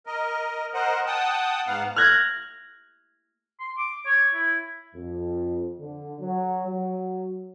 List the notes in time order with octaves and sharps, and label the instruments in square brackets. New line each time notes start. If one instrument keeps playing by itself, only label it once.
[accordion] A#4 D#5
A#4 C5 D#5 F#5
F#5 G5 A5 D#6
G#2 B3 F5 F#5
[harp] F6 F#6 G#6 A#6
[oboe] C6
D6
C#5
E4
[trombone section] F2
D3
F#3
F#3